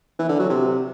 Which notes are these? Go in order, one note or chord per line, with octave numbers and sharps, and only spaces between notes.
E3
D3
F#3
C3